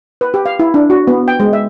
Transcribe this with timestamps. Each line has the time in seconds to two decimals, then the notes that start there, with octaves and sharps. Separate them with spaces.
0.21 B4
0.34 G4
0.46 F5
0.59 E4
0.74 D4
0.90 F#4
1.07 B3
1.28 G5
1.40 G#3
1.53 E5